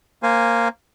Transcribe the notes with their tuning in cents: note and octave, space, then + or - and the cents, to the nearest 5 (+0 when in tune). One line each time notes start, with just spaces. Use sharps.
A#3 -5 C5 +0 G#5 +0